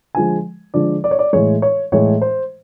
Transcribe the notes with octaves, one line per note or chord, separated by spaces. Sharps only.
D3 F3 G#3 G#5
D3 F3 G#3 D5
D5
C#5
D5
A2 E3 G#3 C#5
C#5
A2 E3 G#3 C#5
C5